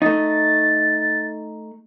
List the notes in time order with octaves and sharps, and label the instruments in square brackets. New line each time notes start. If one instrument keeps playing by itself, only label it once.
[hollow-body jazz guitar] A3 D#4 [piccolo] A6